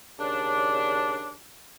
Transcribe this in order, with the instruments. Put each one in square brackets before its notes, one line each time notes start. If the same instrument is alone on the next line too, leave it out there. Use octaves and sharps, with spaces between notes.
[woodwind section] D#2 C#3 D4